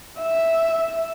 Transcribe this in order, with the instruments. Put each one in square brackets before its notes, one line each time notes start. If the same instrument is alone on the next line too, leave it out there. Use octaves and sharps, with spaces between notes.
[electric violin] E5